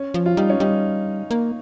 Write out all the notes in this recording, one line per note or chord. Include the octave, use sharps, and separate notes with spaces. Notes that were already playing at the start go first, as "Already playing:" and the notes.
Already playing: C#4
F3
F4
G3 D#4
C#4
G3 D#4
A#3